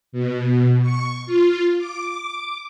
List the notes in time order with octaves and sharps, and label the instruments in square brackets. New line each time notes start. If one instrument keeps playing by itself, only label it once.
[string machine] B2
C#6
F4
D6